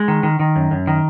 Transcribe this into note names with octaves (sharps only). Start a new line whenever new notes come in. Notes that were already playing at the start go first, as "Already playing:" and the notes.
Already playing: G#3
D#3
D#3
D#3
F#2
F#2
D#3